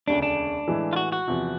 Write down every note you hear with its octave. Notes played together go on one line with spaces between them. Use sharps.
E1 D2 C#3 D4
D4
A2 E3 G#3
F4
F#4
F#4
E2 C3 F3